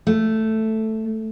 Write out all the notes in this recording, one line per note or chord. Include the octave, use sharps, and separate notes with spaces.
A3